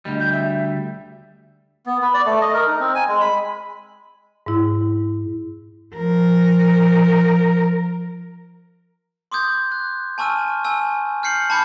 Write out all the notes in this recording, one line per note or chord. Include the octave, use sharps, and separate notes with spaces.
D2 G3 D#5
G6
E5
B3
B4
D5
A3
D#5
A#4
D#4
C4
G#5
G#3
B5
G#2 E4
F3 A#4
C6 D6 D#6 G6 G#6
F#6
G#5 A5 C#6 E6 F6 D#7
G#5 A5 E6
F6 G6 C7 C#7 F#7
A5 B5 D6 G6 G#6 C#7